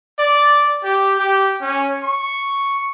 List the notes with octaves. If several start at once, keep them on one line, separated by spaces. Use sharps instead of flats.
D5
G4
G4
C#4
C#6